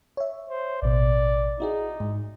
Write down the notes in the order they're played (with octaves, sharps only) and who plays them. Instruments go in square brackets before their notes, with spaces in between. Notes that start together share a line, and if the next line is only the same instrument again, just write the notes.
[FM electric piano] C#5 E5
[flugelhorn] C5
[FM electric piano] A1 B2 [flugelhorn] D5
[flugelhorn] D#4 [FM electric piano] E4 F#4 G#4
[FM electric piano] G#2